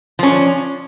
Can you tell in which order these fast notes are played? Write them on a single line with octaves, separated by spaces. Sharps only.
F3 C#4 D4